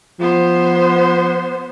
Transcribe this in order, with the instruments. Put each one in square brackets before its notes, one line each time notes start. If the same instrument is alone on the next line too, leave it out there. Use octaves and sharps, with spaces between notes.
[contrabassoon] F3 [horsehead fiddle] B3 C5